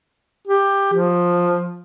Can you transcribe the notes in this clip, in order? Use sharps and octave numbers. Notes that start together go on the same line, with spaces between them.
G4
F3